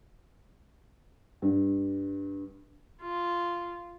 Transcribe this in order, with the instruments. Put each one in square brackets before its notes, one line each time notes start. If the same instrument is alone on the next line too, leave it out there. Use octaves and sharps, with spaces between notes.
[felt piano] G2
[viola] F4